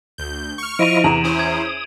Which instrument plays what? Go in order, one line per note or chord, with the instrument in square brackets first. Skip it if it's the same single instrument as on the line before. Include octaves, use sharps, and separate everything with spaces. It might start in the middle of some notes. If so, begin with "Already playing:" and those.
[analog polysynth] D2 G6
C#6 F6
[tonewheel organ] F3 E4 D#5 [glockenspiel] D7 D#7 F7
[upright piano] E2 A#5 [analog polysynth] C3 E3 [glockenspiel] E7 F#7
[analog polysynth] C#4 E4 C5 [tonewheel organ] D#6
[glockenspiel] G#6